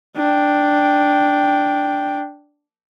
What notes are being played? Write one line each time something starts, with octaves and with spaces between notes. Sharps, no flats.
D4 G5